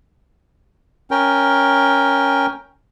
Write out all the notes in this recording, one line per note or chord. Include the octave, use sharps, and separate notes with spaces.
C#4 A#4 G5